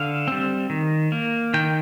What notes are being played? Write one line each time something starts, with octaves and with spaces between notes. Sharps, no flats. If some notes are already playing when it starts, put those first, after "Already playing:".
Already playing: D3 F5
G3 C4
D#3
A#3
D#3 G5